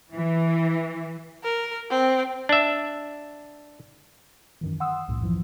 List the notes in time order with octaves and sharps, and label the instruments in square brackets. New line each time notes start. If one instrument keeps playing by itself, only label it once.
[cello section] E3
[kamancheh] A#4
C4
[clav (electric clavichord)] D4 E5
[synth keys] F#2 D#3 E3
F#5 C6 D#6 E6
C2 F2 A2
F#2 E3 F3